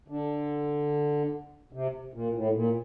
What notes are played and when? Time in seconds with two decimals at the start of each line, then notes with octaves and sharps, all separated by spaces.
0.08 D3
1.73 C3
2.14 A#2
2.34 A2
2.54 A#2